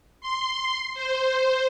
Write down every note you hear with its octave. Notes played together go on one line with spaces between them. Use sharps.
C6
C5